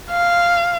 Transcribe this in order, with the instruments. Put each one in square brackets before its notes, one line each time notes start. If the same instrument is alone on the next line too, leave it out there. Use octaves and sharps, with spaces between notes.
[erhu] F5